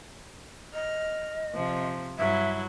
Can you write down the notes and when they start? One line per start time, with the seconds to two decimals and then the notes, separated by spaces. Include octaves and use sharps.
0.74 D#5 F6
1.54 C3 F3
2.18 G2 F#3 E4 E5